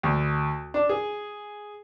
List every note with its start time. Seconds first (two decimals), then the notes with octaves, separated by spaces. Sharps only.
0.03 D2
0.74 D4
0.89 G#4